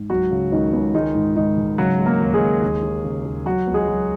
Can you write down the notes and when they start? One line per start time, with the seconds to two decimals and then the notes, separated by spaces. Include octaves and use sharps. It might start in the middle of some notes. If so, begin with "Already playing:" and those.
Already playing: G#2
0.10 C#2 F#3 F#4
0.31 C#3
0.52 C#2 D#3 D#4
0.73 C#2
0.94 D#3 G#3 D#4
1.15 G#2
1.36 G#2 D#3 D#4
1.58 G#2
1.78 C#3 F#3 F#4
1.99 G#3
2.06 A#3 A#4
2.20 D#2
2.34 G#3 G#4
2.41 D#2
2.62 D#2
2.83 D#2
3.04 C#3
3.25 D#2
3.46 F#3 F#4
3.67 C#2
3.74 G#3 G#4
3.88 F#3